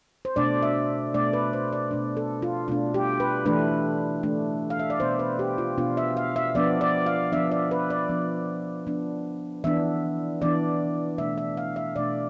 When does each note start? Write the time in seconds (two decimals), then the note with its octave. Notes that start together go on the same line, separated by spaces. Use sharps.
0.25 C5
0.36 B2 A3 D4 D5
0.62 E5
1.14 B2 A3 D4 D5
1.33 B4
1.53 C5
1.73 D5
1.91 B2 A3 D4
2.17 A4
2.42 F4
2.68 B2 A3 D4 F4
2.94 G4
3.20 B4
3.45 E3 A3 D4 B4
4.23 E3 A3 D4
4.70 F5
4.79 E5
4.90 D5
5.00 B2 B3 D4 C5
5.19 B4
5.39 G4
5.58 F4
5.78 B2 B3 D4 F4
5.97 E5
6.17 F5
6.36 E5
6.55 F3 B3 D4 D5
6.81 D5
7.06 F5
7.32 F3 B3 D4 E5
7.51 D5
7.71 B4
7.90 D5
8.09 F3 B3 D4
8.87 F3 B3 D4
9.64 E3 B3 D4 E5
10.42 E3 B3 D4 D5
11.18 B2 A3 D4 E5
11.38 E5
11.57 F5
11.76 E5
11.96 B2 A3 D4 D5